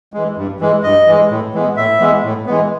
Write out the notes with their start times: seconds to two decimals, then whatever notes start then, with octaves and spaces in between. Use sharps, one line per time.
0.13 E3 G#3
0.37 G2
0.60 E3 G#3
0.83 G2 D#5
1.07 E3 G#3
1.30 A2
1.54 E3 G#3 B3
1.77 A2 E5
2.00 E3 G#3 B3
2.24 A2
2.46 E3 G#3 B3